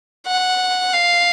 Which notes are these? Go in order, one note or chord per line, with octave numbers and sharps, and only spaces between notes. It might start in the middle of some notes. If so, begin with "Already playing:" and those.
F#5
F5